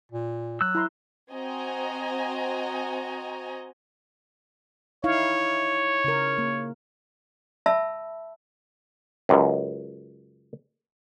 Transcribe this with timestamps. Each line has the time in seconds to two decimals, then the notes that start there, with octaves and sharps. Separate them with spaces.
0.12 A#2
0.61 F#3 E6 F#6
0.75 E4 A#5 C6
1.31 C4 F#4 D#5 G#5 A#5
5.04 D#4 E4 C#5 F5
6.04 C#3 A#4
6.38 A#3
7.66 E5 A5 B5 E6
9.29 C#2 F#2